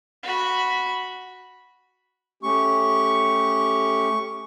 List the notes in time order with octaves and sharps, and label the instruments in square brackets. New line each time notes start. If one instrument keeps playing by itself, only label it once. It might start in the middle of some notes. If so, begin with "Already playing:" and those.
[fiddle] F#4 B5
[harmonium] A3 C#4 G4 [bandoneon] C#6